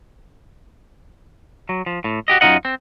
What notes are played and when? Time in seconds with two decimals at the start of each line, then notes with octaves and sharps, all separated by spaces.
1.69 F#3
1.86 F3
2.04 A2
2.28 F#4 G4 D#5
2.41 F#2 G#3 D#4 F4 D#5 F#5
2.65 C4